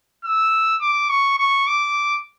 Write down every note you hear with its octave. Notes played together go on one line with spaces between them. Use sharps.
E6
D6
C#6
C#6
D6